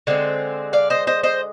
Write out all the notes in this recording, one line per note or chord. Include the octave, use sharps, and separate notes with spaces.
D3 G#3 C4
D5 F5
C5 D#5
C5 D#5
C5 D#5